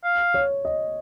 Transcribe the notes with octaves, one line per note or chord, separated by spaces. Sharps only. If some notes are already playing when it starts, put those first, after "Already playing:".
F5
C#5
D#5